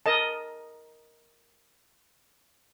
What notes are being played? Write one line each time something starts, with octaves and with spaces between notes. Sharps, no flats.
A#4 D#5 A5